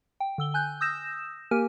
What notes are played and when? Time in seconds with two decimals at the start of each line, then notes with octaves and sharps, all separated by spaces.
0.20 G5
0.38 D3 E6 G7
0.54 G#5 F#6 G6
0.81 D#6 E6 G6 A#6 E7
1.51 A#3 G4 A#4 G#5 F6 D#7